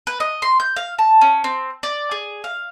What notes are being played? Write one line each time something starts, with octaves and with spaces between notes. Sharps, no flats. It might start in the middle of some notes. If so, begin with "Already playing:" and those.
B4
D#5
C6
G6
F5
A5
C#4
C4
D5
G#4
F5